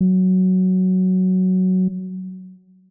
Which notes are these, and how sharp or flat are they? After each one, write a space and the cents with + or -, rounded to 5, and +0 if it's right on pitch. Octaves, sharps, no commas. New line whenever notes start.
F#3 +5